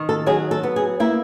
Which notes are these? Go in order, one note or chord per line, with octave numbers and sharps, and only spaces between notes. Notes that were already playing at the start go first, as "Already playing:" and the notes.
Already playing: D#3
A4
F#3 G#4
A4
B3
G#4
A#3 E4